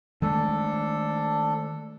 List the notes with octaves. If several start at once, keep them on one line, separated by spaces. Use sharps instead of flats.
D#3 G#3 A3 D4 A4